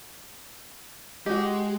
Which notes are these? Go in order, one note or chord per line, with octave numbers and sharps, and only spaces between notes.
G#3 F#4 G4 D#5